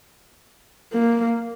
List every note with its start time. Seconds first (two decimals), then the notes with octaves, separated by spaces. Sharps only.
0.93 A#3